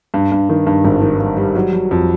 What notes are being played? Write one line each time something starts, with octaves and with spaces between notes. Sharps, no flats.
G2
G2
D#3
G2
G#1
D#3
G2
G3
F#3
F#3
F2